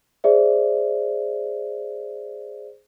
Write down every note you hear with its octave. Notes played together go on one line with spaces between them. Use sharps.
G#4 C5 D5 E5